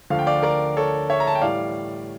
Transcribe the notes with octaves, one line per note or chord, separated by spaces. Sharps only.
D2 D3 F3 F5
G5
D5 F5
A#4 D5
A4 C#5
C#5 E5
A#5
A5
G5
A2 E3 G3 D5 F5